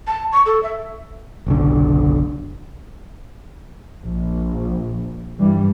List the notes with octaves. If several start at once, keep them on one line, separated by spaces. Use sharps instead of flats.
A5
C#6
A4
E5
F#1 B1 D3
A#1
G2 E3 G3